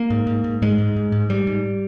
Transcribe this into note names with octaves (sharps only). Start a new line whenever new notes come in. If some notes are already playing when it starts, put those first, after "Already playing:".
Already playing: A#3
G#2
G#2
G#2
G#2 G#3
G#2
G#2
G#2
G#2 G3
G#2